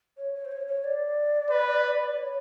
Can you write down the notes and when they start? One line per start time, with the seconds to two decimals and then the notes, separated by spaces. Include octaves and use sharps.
0.17 C#5
0.34 C#5
0.45 C5
0.51 C#5
0.67 C#5
0.84 D5
1.50 B4
2.16 C#5